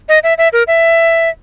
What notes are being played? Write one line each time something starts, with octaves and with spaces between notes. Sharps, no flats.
D#5
E5
E5
A#4
E5